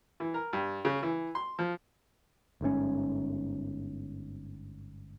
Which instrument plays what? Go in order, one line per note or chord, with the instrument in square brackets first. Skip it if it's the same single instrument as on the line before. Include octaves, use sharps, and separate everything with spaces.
[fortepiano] E3
A#4
G2
C#3
E3
C6
F3
[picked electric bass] G1 G#2 B2 C#4